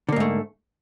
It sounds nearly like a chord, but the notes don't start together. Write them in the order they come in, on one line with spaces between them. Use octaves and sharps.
D3 A#3 G#2 A3